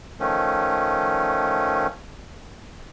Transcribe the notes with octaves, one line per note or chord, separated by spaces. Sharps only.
D#3 F3 A3 C#4